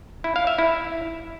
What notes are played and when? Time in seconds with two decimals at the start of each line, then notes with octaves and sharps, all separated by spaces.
0.24 E4
0.36 F5
0.47 E5
0.58 E4